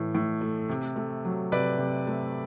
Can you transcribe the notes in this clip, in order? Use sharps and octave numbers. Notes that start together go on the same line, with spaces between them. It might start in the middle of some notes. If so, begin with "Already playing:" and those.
Already playing: A2 E3 A3
A2
A3
C3
A3
F#3
C3 B4 D5
C3
A3